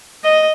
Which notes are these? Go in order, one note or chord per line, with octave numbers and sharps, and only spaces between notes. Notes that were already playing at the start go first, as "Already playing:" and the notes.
D#5